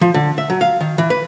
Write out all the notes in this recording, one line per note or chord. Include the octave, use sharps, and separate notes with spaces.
F3
D3
E5
F#3
F5
D#3
E3
B4